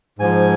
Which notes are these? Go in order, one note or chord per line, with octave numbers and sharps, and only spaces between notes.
G#2 F3 G#5